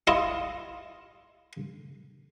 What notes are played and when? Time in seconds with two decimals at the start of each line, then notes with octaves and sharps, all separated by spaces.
0.07 E4 F4 D#5